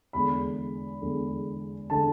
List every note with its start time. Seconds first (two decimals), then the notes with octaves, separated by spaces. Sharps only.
0.13 E2 D3 G#3 B5
1.02 E2 D3 G#3
1.90 D3 G#3 A5